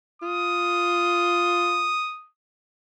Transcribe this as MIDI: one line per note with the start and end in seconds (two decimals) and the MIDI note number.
0.22 1.98 65
0.22 2.29 87